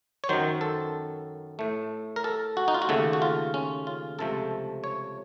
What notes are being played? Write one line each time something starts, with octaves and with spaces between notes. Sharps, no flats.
C#5
F#2 D#3 F#3 C5
A4
A2 A3
A#4
A4
F#4
D#4
F4
F#4
D#2 C#3 A3 A4
F#4
F4
C#4
F4
C#2 C3 F3 A3 A4
C#5